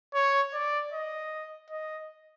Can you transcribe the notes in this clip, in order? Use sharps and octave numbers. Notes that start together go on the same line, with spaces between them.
C#5
D5
D#5
D#5